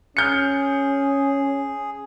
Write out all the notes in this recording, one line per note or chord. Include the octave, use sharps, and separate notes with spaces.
C#4 G#4 F6 G6 C#7